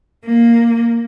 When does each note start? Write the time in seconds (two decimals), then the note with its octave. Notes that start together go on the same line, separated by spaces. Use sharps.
0.25 A#3